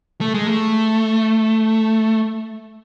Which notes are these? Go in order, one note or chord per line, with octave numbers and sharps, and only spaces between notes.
A3
G#3
A3